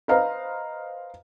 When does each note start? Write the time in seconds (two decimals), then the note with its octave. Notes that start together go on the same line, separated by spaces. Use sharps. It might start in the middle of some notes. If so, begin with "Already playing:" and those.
0.08 B4 C5 D#5 F5 A#5